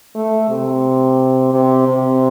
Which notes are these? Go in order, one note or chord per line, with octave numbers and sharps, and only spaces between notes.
A3
C3
C3
C3